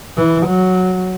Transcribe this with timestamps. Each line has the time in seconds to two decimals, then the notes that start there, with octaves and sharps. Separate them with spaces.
0.17 E3
0.46 F#3